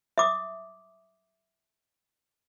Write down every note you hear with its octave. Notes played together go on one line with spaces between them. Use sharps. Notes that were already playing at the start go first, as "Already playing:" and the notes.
E5 D6 D#6